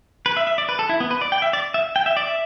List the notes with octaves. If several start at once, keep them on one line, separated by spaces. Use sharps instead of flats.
B4
E5
E5
D5
B4
A4
E4
B3
B4
D5
G5
E5
D5
E5
G5
E5
D5
E5